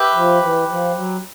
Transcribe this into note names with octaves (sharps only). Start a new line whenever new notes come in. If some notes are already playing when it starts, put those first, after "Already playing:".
Already playing: G4 B4 E5
F3
E3
F3
F#3